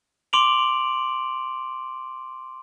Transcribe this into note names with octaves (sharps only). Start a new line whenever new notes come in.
C6 D6 D7 F7 F#7